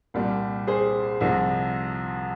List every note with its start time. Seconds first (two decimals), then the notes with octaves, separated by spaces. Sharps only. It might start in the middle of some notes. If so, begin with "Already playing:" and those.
0.14 C2 A#2 G3
0.67 G#4 C5
1.21 C2 C3 F3